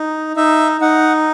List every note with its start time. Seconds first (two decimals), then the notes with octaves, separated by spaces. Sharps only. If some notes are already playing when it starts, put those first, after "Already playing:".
Already playing: D#4
0.36 D#4 E5
0.81 D#4 F#5